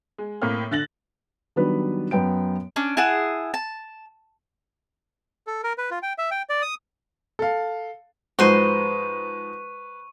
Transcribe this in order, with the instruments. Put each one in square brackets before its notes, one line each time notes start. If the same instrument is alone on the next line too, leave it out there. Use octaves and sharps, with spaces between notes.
[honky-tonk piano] G#3
A2 A#3 C4 F6
D3 F#6 A6 A#6 F#7
[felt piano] D#3 F#3 G3 B3 D4 B4
F#2 B3 G5 D7
[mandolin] C#4 D4
E4 G#4 F#5 A5
A5
[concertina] A4
A#4
B4
F4
G5
E5
G5
D5
D#6
[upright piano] A4 F5
[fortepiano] G#2 F3 G#3 [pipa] F#4 C5 [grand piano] B4 [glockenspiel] C#6 D#7